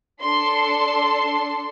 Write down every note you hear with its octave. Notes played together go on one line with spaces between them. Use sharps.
D4 A4 C6
C6